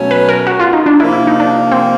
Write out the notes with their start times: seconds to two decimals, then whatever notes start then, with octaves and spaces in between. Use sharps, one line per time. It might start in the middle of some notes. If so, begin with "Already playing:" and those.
Already playing: B2 F#3 A3 C#4
0.11 B4
0.29 A#4
0.47 F#4
0.60 F4
0.73 D#4
0.86 D4
1.00 C3 F3 A#3 E4
1.13 E4
1.27 D#4
1.40 D4
1.72 C4